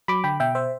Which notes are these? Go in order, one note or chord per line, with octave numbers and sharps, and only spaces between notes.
F#3 B5 D6
D3 G5 B5
B2 E5 G5
C5 E5